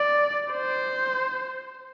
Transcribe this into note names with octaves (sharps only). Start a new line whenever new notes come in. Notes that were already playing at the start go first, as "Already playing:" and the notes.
Already playing: D5
C5